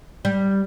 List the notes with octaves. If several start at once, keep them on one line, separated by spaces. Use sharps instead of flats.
G3